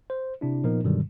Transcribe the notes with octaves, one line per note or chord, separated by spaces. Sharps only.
C5
C3 D4 E4
A#2 F3 B3 D#4 A#4
G2 B2 D3 D#3 F#3 G3